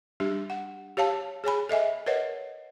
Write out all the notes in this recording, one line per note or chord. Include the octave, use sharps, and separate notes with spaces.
G3 D4 G4
F#5
G4 C#5 F5 A5
G#4 C#5 G#5 B5
A4 D#5 E5 G#5
A#4 B4 C#5 D#5 F#5